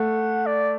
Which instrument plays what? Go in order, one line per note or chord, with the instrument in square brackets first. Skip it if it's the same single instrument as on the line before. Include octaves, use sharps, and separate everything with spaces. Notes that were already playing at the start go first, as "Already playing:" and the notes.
Already playing: [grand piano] A3 [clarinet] F#5
[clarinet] D5